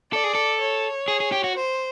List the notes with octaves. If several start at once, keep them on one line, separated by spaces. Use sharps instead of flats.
A4 D5
G#4
A4
C#5
G#4
G#4
G4
F#4
C5